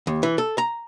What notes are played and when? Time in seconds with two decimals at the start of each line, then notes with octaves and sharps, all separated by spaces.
0.07 D#2
0.23 E3
0.38 A4
0.58 A#5